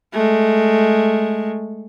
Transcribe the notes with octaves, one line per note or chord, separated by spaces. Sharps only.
G#3 A3